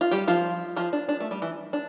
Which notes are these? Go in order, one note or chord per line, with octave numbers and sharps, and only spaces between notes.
F4
G3 G4
F3 F4
F3 F4
D4
D4
A3
G3
E3
D4